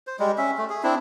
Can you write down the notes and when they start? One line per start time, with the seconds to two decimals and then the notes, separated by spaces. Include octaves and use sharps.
0.07 C5
0.19 G3 G#3
0.38 C#4 E5
0.58 A3
0.70 G#4
0.83 C4 D4 E4